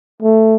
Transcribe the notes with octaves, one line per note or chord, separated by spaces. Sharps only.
A3